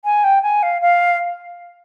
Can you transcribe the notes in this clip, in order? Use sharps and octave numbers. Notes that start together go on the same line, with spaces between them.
G#5
G5
G#5
F5
F5